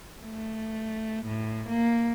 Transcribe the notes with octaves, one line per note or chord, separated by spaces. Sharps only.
A3
A2
A#3